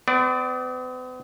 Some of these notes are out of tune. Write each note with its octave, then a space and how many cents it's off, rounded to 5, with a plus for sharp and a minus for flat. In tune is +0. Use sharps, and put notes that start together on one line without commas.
B3 +45 D5 +0